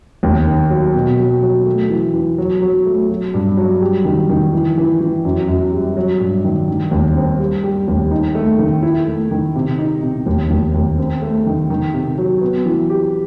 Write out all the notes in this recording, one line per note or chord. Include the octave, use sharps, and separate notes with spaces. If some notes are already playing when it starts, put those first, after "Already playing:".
D#2
D#3
F#3
B2
F#3
F#3
A3
E3
E3
F#3
F#3
A3
F#3
G2
F#3
G3
D#3
D#3
E3
E3
E3
F#2
F#2
G3
F#3
G2
D#3
D#3
D#2
C4
G3
G3
D#2
D#4
A3
D#3
E4
A3
D#3
C3
D#4
C3
D#2
D#2
D#2
C4
A3
D#3
D#3
C3
F#3
B3
E3
G4